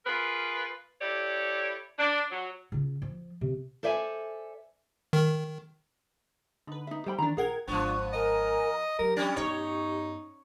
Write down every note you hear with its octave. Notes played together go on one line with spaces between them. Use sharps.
F4 G#4 A#4 B4
E4 G4 A4 C#5 D5
D4
F#3
C#3 F4
F3
C3
A4 C5 D5 E5 F5 G#5
D#3
D3 D#4 B4
D#4 E5
G3 C5 G5 B5
D#3 E3 D4 A#5
A#1 G#4 A#4 F#5 G5 G#6
G#1 F3 B3 D4 F4 C#6
A#4 D#5 G#5 A#5
F#3 G4 A#4
G3 C#4 D4
G2 B3 D#4 C#5